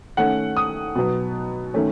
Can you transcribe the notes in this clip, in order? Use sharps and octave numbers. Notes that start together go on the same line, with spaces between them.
D#3 A3 C#4 F#5
D#6
B2 F#3 B3
D#3 A3 C#4